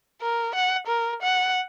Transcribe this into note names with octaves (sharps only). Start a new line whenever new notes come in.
A#4
F#5
A#4
F#5